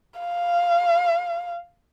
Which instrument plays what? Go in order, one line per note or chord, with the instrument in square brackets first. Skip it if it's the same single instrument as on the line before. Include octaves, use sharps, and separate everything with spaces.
[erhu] F5